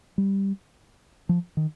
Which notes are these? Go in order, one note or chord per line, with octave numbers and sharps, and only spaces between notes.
G3
F3
D#3